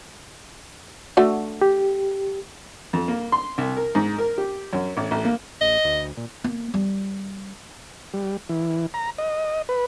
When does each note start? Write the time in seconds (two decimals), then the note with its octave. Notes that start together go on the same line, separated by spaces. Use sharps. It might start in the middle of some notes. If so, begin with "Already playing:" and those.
1.17 D3 A3 F#4
1.61 G4
2.93 F2
3.08 A#3
3.32 C6
3.58 C2
3.77 A#4
3.95 G#2
4.18 A#4
4.38 G4
4.73 F#2
4.97 A1
5.11 A1
5.25 A#3
5.61 A#1 D#5
5.84 D2
6.17 A#2
6.44 A#3
6.74 G3
8.14 G3
8.49 E3
8.94 A#5
9.18 D#5
9.69 B4